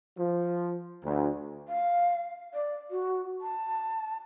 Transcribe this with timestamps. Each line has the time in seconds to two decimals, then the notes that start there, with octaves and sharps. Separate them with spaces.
0.17 F3
1.04 D2
1.67 F5
2.54 D5
2.91 F#4
3.41 A5